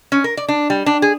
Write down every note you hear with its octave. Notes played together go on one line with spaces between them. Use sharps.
C#4
A#4
D5
D4
G3
D4
G#4